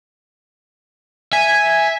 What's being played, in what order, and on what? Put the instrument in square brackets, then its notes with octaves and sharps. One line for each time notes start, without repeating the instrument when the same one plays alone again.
[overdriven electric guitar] E5 [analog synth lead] G#5